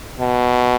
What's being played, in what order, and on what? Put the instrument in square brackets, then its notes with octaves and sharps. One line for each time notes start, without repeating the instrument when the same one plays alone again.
[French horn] B2